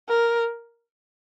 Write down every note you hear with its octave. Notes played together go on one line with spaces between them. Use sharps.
A#4